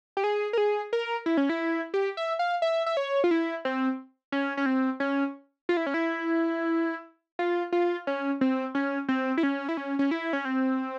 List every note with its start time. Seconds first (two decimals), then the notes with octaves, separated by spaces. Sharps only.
0.17 G4
0.24 G#4
0.53 A#4
0.58 G#4
0.93 A#4
1.26 E4
1.37 C#4
1.49 E4
1.94 G4
2.17 E5
2.39 F5
2.62 E5
2.86 E5
2.97 C#5
3.24 F4
3.31 E4
3.65 C4
4.32 C#4
4.57 C#4
4.66 C4
5.00 C#4
5.69 F4
5.77 E4
5.86 C#4
5.94 E4
7.39 F4
7.72 F4
8.07 C#4
8.41 C4
8.75 C#4
9.08 C4
9.37 E4
9.43 C#4
9.69 E4
9.77 C#4
9.99 C#4
10.11 E4
10.33 C#4
10.45 C4